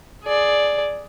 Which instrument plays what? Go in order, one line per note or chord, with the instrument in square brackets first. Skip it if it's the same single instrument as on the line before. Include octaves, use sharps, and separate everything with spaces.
[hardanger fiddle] G#4 D5